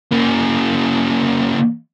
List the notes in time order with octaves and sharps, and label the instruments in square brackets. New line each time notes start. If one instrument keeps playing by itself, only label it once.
[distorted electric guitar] C#3 A#3